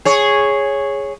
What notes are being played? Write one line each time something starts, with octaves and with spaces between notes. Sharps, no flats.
G#4 C#5